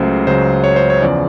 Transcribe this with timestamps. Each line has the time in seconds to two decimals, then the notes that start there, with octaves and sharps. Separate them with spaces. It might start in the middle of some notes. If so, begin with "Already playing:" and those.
Already playing: C#2 C#3 F#3 A3 C5
0.27 C#2 C#3 F#3 C5
0.64 C#5
0.76 C5
0.90 C#5
1.02 E2 C#3 F3 D5